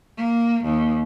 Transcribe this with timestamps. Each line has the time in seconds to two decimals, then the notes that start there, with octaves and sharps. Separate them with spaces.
0.18 A#3
0.64 D#2